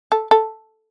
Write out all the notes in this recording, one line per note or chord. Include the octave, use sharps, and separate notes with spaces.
A4
A4